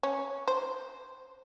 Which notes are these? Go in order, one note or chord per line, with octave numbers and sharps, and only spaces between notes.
C#4
C5